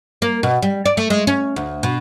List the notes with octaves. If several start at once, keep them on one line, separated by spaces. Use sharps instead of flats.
A#3
B2
G3
D5
A3
G#3
C#4
D2
B2